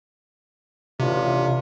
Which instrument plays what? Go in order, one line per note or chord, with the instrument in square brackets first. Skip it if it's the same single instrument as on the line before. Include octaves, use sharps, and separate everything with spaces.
[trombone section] A1 D4 F4 [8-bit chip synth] C3